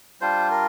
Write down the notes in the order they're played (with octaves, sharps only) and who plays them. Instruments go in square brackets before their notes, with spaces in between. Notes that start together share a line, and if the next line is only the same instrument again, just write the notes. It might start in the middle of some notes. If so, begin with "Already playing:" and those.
[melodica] G3 D4 F4 C5
A#4